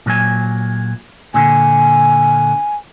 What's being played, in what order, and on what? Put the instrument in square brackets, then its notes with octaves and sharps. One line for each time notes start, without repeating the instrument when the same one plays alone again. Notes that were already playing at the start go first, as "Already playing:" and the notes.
[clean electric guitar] A#2 F#3 G#5
[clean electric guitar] A#2 D3 [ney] G#5